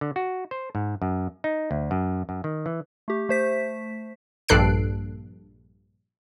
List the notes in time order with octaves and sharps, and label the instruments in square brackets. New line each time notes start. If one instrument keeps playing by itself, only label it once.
[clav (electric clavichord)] D3
F#4
C5
G#2
F#2
D#4
D2
F#2
F#2
D#3
E3
[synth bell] A3 G4
A3 C5 B6
[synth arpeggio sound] A#1 G2 A4 F#6 C7 D7